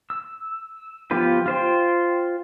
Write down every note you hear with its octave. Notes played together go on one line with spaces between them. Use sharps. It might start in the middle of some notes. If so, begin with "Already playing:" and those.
E6
F3 B3 F4 G4 B4
F4 C5 G5